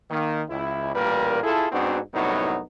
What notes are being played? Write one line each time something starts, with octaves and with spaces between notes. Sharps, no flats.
D#3 A#3
C#2 E4
A1 A#2 G3 A#3 A#4 B4
E4 F4 G#4 A4
G#2 B3 C4 D4 F#4
C2 F#2 A2 F#3 B3 D#4